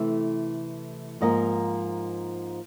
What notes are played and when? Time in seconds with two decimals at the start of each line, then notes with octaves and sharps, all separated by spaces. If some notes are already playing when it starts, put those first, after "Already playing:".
Already playing: C3 E3 A3 E5
1.21 G#2 F3 A#3 D#5